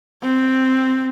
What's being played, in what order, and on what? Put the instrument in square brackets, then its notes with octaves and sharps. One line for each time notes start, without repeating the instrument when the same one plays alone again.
[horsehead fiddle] C4